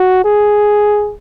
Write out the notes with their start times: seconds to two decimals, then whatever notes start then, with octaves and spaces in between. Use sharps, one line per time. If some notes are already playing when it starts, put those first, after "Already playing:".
Already playing: F#4
0.24 G#4